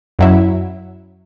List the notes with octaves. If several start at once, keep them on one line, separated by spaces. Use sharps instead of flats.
F#2 F#3 E4